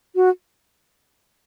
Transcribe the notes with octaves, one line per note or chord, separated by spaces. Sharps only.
F#4